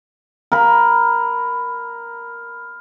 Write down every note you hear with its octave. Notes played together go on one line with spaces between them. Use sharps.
A#4 B5